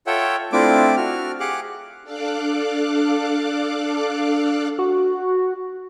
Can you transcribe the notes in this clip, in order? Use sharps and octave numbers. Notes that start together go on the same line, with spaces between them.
F4 A4 C#5 E5 F#5 G5
A3 C4 D4 E4 F4 D6
F#4 F6
G4 G#4 F5 F#5 D6 F#6
D4 A4 F5 D6 F#6
F#4